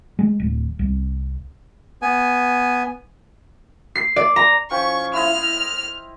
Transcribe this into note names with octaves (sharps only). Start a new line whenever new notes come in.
G#3
D1
C2
B3 G#5
C7
D5
A#5
F3 C#4 G5 C#6
E4 C5 D#5 F6